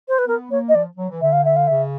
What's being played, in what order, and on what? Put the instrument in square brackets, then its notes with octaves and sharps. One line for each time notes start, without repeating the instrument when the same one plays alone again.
[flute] C5
B4
[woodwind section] B3 [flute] A#4
[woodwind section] A#3 [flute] C#5
[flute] D#5
[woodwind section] F3 [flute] D5
[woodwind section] F#3
E3
[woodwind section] D3 [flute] E5
[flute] F5
E5
F5
[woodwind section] C#3 [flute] E5